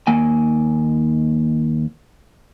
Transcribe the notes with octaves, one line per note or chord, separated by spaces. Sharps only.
D#2 A#3 G#5